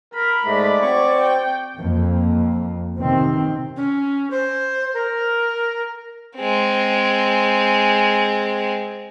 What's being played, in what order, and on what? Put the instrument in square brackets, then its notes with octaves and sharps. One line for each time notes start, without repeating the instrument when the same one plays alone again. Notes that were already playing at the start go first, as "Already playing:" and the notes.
[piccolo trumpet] A#4 [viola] B5
[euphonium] G#2 [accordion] G#3 A3 [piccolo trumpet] D5
[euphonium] C4 [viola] F#4 C#5 [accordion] C#6
[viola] G5
[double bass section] F2 A#3
C3 D#3 C4
[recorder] C#4
C5
A#4
[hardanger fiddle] G#3 C4